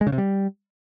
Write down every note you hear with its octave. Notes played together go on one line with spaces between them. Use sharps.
G#3
C#3
C3
G3